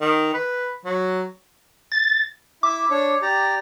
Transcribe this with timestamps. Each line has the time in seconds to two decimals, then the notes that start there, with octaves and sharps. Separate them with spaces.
0.01 D#3
0.34 B4
0.85 F#3
1.92 A6
2.63 E4 E5 D6
2.90 D4 C#5
3.22 G4 D5 A#5